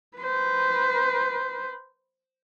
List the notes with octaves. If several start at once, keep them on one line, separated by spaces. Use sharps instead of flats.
B4 C5